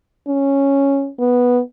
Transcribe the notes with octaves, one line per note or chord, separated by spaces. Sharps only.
C#4
B3